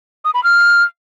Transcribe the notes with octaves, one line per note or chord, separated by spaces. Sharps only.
D#6
B5
F6